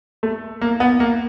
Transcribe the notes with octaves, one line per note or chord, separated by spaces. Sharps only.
A3
A#3
B3
A#3